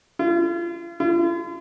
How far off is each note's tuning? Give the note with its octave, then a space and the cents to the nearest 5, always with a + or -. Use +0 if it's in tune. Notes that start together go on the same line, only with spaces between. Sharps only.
F4 -40
F4 -45